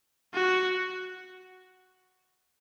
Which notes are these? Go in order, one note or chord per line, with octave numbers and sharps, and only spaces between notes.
F#4